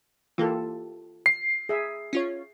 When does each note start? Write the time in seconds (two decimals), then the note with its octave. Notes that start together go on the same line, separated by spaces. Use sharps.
0.38 E3 A#3 F4 G4 A4
1.26 C7
1.69 G#4 E5
2.13 C#4 F4 C#5